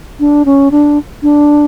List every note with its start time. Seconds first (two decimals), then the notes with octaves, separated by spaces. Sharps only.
0.20 D4
0.45 C#4
0.71 D4
1.23 D4